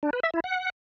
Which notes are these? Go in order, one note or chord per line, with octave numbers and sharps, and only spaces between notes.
D4
B4
E5
E4
F#5